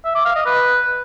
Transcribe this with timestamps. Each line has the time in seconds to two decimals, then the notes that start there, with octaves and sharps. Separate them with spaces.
0.05 E5
0.15 D6
0.25 F5
0.36 D#5
0.46 B4